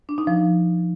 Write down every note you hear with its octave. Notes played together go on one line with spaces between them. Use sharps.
D4
D#4
F3